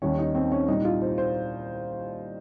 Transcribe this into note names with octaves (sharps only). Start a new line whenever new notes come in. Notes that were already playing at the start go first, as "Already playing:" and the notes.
D#2 D#3 G3 C#4
D#4
C4
C#4
C2 A#2 G3 D#4
F4
C5
C5